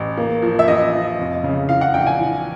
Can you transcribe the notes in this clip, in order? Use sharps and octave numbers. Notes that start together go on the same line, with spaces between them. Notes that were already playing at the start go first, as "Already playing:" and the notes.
Already playing: A1
A#3
F3
E5
A1 D#5
F3
F1
C#3
E3 F5
F#5
A#1 G5
G#5
E3